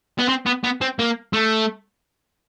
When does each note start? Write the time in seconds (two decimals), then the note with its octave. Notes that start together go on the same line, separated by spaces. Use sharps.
0.19 B3
0.29 C4
0.46 B3
0.64 B3
0.81 C4
0.99 A#3
1.33 A3